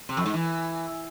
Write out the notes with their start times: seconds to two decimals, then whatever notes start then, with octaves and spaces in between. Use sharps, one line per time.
0.09 C3
0.17 F2
0.25 G#2
0.34 E3